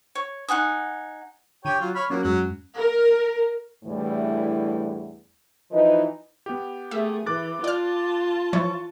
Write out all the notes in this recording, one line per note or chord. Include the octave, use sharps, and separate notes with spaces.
C#5
D#4 F#5 G#5 D#6
D3 G4 C#5 G5 D#7
F#3 F4
C#5 B5 F6
F#3 A#3 C#4 F#4
F#2 F#3 G#3 C#4 F#6
A#4
E2 A2 D3 E3 G3 A3
E3 F3 D#4 B4 D#5
B3 G4
A3 G#4 E5
E3 D6 F#6 A6
F4 D5 A5 F6
E3 F3 C#5 C#6